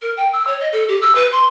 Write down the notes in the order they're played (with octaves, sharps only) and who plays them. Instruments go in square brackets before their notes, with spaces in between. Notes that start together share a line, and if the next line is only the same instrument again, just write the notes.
[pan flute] A#4
G5
E6
C#5
D#5
A4
G4
E6
B4
C6